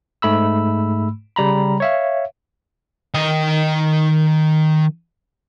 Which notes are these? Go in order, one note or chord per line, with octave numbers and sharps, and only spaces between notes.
G#2 A3 B5 E6
C#3 G3 A#5 B5
C#5 E5 F5
D#3 D#5